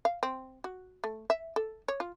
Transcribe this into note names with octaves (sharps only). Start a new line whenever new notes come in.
F5
C4
F#4
A3
E5
A4
C#5
F4